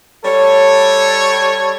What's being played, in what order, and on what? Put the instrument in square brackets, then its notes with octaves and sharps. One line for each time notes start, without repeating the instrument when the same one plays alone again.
[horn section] G3 A4 C#5